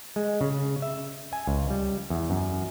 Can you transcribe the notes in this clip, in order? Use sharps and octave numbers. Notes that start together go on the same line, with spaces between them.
G#3
C#3
E5
G#5
C#2
G3
E2
F#2